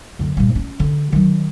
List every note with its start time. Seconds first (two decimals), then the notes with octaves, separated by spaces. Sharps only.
0.19 F#2 D3
0.37 G2 A#2
0.55 C#4
0.80 D3
1.12 D#3 F#3